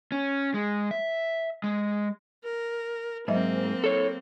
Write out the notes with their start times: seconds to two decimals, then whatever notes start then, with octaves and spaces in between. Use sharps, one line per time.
0.12 C#4
0.54 G#3
0.91 E5
1.64 G#3
2.44 A#4
3.28 G#2 F#3 A#3 C4 D#5 E5
3.84 A4 C#5